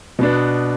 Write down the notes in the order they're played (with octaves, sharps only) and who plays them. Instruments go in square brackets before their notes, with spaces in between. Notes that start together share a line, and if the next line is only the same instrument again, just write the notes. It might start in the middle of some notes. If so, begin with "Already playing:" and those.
[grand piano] B2 B3 D4